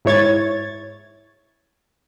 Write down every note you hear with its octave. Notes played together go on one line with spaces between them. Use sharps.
G#2 E4 C#5 G#6 A6